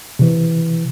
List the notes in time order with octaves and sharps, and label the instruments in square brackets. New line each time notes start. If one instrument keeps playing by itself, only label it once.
[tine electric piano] C3 E3